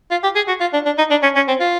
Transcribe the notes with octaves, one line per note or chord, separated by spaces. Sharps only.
F4
G4
G#4
F#4
F4
D4
D4
D#4
D4
C#4
C#4
C4
F4